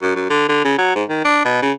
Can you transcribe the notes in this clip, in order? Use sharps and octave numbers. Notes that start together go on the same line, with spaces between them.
F#2
F#2
D3
D3
C#3
F#3
G#2
D#3
D4
B2
C#3